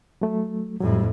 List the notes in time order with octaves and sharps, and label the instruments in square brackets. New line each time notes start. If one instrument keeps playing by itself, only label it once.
[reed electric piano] F#3 A3
[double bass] F2 A2 [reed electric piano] F#3 G3